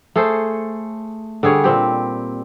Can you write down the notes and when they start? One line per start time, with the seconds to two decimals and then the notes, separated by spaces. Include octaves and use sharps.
0.16 A3 G#4 A4 C5
1.43 D3 G3 G#4 C#5
1.64 A#2 C4 G4